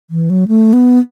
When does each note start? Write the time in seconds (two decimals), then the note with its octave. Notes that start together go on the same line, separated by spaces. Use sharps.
0.10 E3
0.30 F#3
0.48 A3
0.73 B3